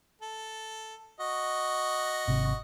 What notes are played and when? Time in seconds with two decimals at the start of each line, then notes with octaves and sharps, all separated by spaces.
0.22 A4
1.20 F#4 D#5
2.28 G#1 C3